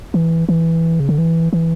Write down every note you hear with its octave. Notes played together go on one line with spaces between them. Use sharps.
E3
E3
C#3
D3
E3
E3